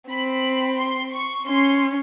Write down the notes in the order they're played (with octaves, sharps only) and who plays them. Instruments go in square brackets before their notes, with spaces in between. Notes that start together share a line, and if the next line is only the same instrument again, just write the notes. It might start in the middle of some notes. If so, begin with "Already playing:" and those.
[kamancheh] C4 [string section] B5
[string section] C6
C#6
[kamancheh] C#4 [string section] C6